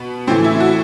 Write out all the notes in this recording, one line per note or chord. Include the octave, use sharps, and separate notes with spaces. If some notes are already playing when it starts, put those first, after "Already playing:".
Already playing: B2 B3
A2 E3 C4
E4
F#4